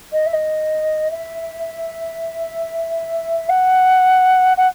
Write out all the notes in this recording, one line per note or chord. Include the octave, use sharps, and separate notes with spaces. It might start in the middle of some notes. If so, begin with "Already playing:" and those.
D#5
E5
D#5
E5
F#5
F#5